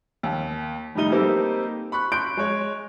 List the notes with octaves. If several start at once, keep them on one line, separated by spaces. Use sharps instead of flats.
D#2
A2 D#3 G3 D#4 D#7 G7
G3 A#3 C4 D#4 G4 A4
B5 C#6 F#6
C6 C#6 F#6 G6 D7
G#3 C#5